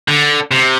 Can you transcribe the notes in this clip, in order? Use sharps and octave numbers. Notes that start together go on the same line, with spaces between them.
D3
C3